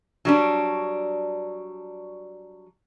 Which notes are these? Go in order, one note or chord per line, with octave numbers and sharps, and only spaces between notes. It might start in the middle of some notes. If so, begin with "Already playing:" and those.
F#3 G3 D4